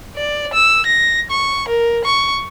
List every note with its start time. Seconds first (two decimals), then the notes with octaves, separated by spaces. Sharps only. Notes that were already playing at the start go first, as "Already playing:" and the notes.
0.16 D5
0.53 E6
0.86 A#6
1.30 C#6
1.68 A#4
2.05 C#6